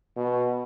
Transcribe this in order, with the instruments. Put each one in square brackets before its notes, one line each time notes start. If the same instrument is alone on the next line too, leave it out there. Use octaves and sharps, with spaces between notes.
[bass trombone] B2